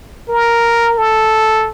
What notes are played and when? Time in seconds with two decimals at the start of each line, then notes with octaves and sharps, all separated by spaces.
0.29 A#4
0.98 A4